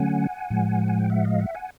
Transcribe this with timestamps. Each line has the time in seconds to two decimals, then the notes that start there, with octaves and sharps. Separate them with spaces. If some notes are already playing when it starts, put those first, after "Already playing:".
Already playing: D3 F#3 A3 C#4 F#5 G#5
0.50 A2 F3 G#3
0.88 G#5
0.99 G5
1.10 E5 F#5
1.25 D#5 F5
1.40 E5 F#5
1.55 F#5 G#5